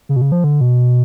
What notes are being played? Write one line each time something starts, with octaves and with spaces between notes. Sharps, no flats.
C#3
B2
C#3
F3
D3
B2